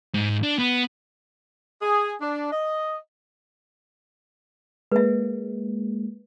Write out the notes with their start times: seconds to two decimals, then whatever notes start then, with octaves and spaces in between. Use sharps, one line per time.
0.14 G#2
0.43 D4
0.59 B3
1.82 G#4
2.21 D4
2.52 D#5
4.92 G#3 A#3 B4 E5